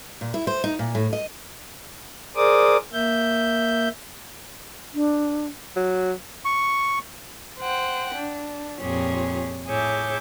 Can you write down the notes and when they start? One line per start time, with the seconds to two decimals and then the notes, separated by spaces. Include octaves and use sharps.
0.21 A#2
0.34 E4
0.47 C5
0.64 D#4
0.79 A#2
0.95 A2
1.13 D#5
2.36 G#4 A#4 C5 D5 D6 D#6
2.93 A#3 E5 G6
4.94 D4
5.76 F#3
6.45 C#6
7.60 C5 F#5 G5
8.15 D4
8.81 F2 A#2 G4 G#4 C#5
9.67 A2 G#4 C#5 E5 D6 G6